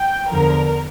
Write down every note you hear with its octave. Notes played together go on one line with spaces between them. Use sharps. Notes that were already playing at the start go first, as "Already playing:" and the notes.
Already playing: G5
E2 D3 F3 A#4